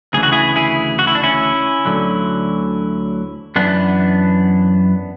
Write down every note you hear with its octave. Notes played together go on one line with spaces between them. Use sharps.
D2 C#3 E3 G#4
F#4
E4 G#4
E4 G#4
F#4
E4
D4
C#4 E4
D2 D3 F#3
F#2 E3 B3 D4